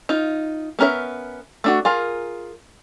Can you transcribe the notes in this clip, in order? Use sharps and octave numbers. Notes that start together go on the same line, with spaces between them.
D#4 F4
B3 C#4 A#4 C5 E5
A3 D4 F#4
F4 G#4 A#4